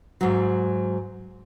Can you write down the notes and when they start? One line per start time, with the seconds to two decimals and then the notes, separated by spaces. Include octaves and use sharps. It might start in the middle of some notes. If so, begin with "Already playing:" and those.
0.21 G#2 F#3